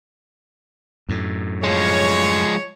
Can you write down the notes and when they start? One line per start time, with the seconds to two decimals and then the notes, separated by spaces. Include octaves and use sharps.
1.09 F#2 A2
1.64 F3 G#3 C#5